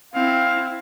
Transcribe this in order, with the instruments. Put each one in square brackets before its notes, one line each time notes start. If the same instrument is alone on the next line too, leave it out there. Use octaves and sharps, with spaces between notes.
[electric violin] C4 E4 [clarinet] F5